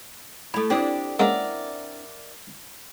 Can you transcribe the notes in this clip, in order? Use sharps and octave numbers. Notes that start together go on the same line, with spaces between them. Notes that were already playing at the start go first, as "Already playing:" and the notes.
A3 E4 A4 B5
C4 D4 E4 G4 D#6
G#3 A#3 C#4 A#4 D5 E5 F#5